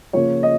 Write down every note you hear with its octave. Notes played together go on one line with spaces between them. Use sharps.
C#3 F3 A#3 C#5
D#5